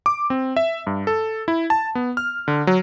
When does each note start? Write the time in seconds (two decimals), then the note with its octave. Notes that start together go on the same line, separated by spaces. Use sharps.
0.06 D6
0.30 C4
0.56 E5
0.87 G2
1.07 A4
1.48 E4
1.70 A5
1.95 B3
2.17 F6
2.48 D3
2.67 F#3